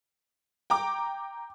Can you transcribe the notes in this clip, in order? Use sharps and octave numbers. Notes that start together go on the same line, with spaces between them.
G5 A#5 D6